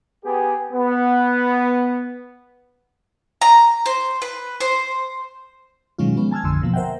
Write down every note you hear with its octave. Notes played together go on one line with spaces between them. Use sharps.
B3 G4 G#4
B3
A#5
C5
B4
C5
B2 D#3 F#3 G#3 C#4 F4
F3 G#3 B3 C#4
G#5 A5 E6 F6 G#6
A#1 F2 D3 C6 E6
B2 F3 A#3
A#4 C5 E5 F#5 G5